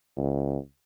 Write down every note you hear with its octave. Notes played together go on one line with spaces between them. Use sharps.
C#2